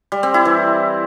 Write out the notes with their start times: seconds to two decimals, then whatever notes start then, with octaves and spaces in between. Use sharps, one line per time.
0.12 G3
0.23 C4
0.34 E4
0.45 E3